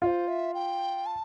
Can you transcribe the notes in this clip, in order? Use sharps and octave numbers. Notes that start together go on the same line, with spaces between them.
F4 C5 E5
E5
G5
A5